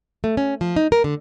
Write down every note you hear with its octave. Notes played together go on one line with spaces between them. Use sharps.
A3
C#4
F3
D#4
A#4
D3